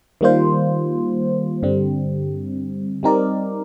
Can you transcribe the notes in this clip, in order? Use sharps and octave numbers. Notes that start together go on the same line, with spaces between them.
D#3 G3 A#3 F4 C5
G2 D3 G3 C4
G3 C4 D#4 A#4 D5